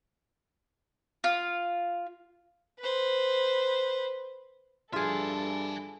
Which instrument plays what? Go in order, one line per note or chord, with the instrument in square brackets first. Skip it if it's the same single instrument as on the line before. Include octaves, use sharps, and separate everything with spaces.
[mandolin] F4
[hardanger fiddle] B4 C5
[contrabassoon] G2 [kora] F4 G#4 [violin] A4 [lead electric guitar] E5 G#5